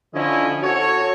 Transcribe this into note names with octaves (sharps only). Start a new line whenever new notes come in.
D3 F3 C#4 E4 D#5
F#4 A4 C#5